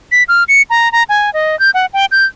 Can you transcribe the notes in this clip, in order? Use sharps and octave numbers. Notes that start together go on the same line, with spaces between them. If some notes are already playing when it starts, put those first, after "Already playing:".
B6
F6
C#7
A#5
A#5
G#5
D#5
G6
F#5
G5
G6